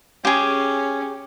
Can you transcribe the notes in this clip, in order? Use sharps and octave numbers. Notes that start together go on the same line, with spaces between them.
C#4 G4 G#4